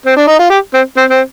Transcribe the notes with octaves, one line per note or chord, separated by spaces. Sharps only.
C4
D4
D#4
F4
G4
C4
C4
C4